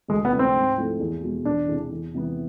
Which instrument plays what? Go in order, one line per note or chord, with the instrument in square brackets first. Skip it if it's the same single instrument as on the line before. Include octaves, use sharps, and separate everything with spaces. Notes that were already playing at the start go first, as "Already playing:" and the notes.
[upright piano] D2 [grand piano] G#3
[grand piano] B3
[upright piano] C3 F3 G#3 D4
[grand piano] C4
[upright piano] G#2
F3 A3 C4 E4
E2
B2 G#3
[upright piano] E1 [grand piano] D4
[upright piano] E2 C3
E2
C3 E3 B3